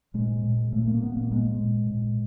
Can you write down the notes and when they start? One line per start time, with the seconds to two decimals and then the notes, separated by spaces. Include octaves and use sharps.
0.14 A#2 G#3
0.43 A#2
0.72 A#2 A3
0.88 A#3
1.02 A#2 B3
1.17 A#3
1.32 A#2 G#3
1.61 A#2
1.91 A#2